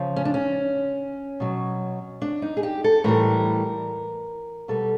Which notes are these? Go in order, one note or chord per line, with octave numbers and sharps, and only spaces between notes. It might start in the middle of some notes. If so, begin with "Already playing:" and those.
Already playing: C#3 F3
C#4
D4
C#4
B2 F#3
D4
D#4
G#4
G4
A4
A2 E3 G3 A#4
B2 G3 A4